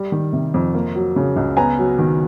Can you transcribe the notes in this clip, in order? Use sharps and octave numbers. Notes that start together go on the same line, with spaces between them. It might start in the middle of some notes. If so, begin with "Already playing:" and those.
Already playing: G3
D#3
C3
F2
A#3
F#3
C#3
C#2
B3 G#5 A#5
F#3
D#3